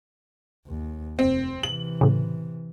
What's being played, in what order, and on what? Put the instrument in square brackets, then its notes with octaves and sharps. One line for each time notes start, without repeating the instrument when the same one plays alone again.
[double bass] D#2
[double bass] F1 [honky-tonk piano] C4
[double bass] C3 E3 [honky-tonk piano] F#7
[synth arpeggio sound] A2 C#3